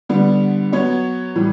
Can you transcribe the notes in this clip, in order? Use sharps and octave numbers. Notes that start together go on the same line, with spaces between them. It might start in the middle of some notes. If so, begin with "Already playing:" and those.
D3 G3 B3 D4
F#3 B3 F#4 C#5
A2 E3 G3